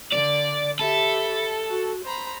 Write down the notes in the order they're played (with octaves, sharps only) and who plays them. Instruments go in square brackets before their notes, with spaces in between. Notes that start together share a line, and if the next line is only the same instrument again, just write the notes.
[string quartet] D3 [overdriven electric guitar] D5
[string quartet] G4 E5 B5 [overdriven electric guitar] A4
[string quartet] F#4
C5 A#5 B5